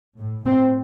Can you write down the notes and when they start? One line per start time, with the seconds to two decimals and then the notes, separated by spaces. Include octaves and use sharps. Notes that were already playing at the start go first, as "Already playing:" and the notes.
0.18 A2
0.45 A2 C4